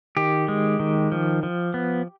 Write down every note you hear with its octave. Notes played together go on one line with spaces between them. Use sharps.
D#3 G4
G#3
D#3
F3
F3
B3